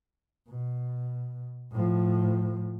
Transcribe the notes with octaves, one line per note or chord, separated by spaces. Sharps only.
B2
A2 F3